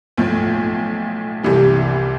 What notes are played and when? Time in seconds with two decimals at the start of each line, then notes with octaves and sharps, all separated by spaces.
0.17 B1 A2 F3
1.43 C2 C3 E3 G3